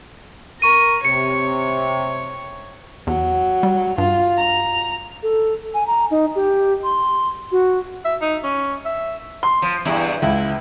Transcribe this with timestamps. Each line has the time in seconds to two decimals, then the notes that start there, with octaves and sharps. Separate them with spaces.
0.62 A#4 C#6 D#7
1.05 C3 C#5 C#7
3.07 E2 F#3
3.63 G3
3.98 G2 F4
4.37 A#5
5.23 A4
5.74 G#5
5.87 A#5
6.11 D#4
6.35 G4
6.84 C6
7.52 F#4
8.05 E5
8.22 D#4
8.44 C#4
8.85 E5
9.43 C6
9.62 F3
9.85 E2 G2 E4
10.22 C#2 E4